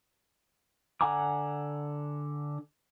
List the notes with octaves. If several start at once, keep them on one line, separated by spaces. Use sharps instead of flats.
D3 F#5 G#5 A#5 D6